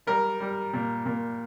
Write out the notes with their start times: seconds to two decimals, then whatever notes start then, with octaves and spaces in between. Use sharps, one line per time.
0.07 G3 A#4
0.40 G3
0.73 A#2
1.06 A#2